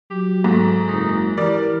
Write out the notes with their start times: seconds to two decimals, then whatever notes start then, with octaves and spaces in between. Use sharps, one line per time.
0.11 F#3 G4
0.44 G#2 A3
0.88 F#1 D#4
1.37 E3 G3 A#4 D5